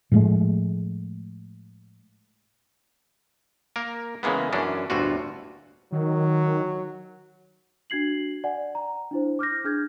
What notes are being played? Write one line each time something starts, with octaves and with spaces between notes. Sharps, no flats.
A2 F3 G#3 A3
A#3 A#4
C#3 E3 G#3 A#3 B3
F#2 E3 C#4 D4
G1 D2 A2 D3 F4 F#4
D#3 F#3
D4 F#4 G#6 C7 F#7
D5 F#5 G#5
A#5
D4 E4 C5
D6 F6 G6 A#6
D4 G#4 F6 G6 G#6